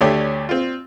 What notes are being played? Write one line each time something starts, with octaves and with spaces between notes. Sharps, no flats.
D2 A3 D4 G4 C#5
C4 F4